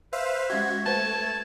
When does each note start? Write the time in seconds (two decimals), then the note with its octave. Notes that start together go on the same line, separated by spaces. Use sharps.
0.13 B4 C5 E5 F5
0.50 G#3 C#4 F#4 G4 E5 G#6
0.86 A3 B4 C5 A5